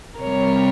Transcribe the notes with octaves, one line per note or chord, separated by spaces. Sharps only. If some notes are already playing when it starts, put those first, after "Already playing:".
C3 G3 A#4 C#5